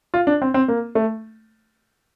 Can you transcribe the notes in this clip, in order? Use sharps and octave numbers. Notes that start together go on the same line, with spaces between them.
F4
D4
C4
C4
A#3
A3